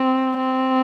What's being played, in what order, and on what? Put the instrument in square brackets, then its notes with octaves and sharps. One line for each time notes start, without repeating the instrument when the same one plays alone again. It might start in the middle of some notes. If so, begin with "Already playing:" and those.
Already playing: [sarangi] C4
C4